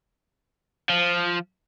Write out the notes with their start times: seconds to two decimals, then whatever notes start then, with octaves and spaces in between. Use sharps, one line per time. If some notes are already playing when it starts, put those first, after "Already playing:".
0.90 F3